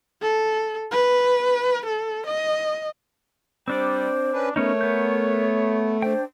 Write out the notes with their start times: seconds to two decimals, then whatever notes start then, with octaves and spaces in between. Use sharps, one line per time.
0.22 A4
0.91 B4
1.85 A4
2.26 D#5
3.68 G3 C4 D4 C5 D5
4.33 C#4 D4 B4
4.56 A3 B3 C#4 D#4 A#4 C#5
4.81 B3 G6
6.02 D4 C5 G5